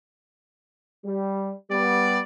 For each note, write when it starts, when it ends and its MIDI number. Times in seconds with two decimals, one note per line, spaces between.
1.05 1.52 55
1.71 2.20 55
1.71 2.20 59
1.71 2.21 74